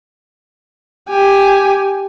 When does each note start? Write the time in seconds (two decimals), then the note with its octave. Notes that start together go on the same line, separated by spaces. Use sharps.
1.09 G4 G#5